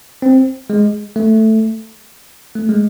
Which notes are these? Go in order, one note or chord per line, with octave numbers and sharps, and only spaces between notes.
C4
G#3
A3
A3
G#3